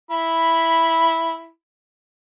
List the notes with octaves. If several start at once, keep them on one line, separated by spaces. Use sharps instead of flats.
E4 B5